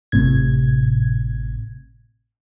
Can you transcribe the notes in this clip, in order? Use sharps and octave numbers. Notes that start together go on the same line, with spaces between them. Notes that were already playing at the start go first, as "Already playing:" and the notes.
G#1 A2 C3 G#6